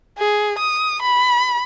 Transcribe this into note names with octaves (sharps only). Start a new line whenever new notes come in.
G#4
D#6
B5